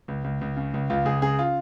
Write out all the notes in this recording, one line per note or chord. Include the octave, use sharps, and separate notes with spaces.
C#2
C#2
C#2
C#3
C#2
C#2 F4
C#2 G#4
C#3 G#4
F4